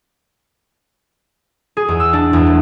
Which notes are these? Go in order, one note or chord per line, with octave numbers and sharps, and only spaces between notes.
G#4
E2
E6
D4
E2
A3